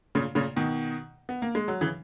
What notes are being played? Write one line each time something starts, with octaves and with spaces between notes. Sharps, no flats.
A#2 C#3
A#2 C#3
B2 D#3
B3
A#3
G#3
F#3
C#3 E3